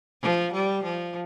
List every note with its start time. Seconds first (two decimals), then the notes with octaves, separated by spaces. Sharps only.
0.22 F3
0.53 G3
0.83 F3